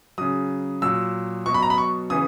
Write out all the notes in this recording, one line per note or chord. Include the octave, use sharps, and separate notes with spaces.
C#3 F#3 D#6
A#2 F#3 E6
B2 F#3 C#6
B5
A#5
B5
C#6
C#3 E3 D#6